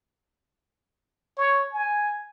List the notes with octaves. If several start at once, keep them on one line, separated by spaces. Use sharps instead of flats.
C#5
G#5